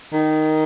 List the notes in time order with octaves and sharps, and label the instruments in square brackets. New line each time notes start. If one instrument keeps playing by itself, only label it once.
[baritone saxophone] D#3